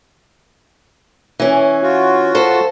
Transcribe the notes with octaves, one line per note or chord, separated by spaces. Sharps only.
E3 C#4
F4 F#4
A4 C5